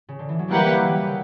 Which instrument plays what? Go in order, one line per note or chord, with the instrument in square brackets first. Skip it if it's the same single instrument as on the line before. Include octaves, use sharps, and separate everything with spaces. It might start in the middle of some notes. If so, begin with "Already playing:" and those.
[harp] C#3
D3
E3
F#3
[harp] G3 [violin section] A#3 E4 G4 B4 F#5
[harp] F#3
E3
C#3